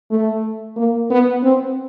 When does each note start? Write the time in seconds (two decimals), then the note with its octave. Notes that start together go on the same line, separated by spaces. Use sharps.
0.11 A3
0.76 A#3
1.10 B3
1.43 C4